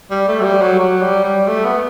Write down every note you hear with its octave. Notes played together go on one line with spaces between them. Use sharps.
G3
A3
F#3
G3
F#3
F#3
G3
G3
A3
B3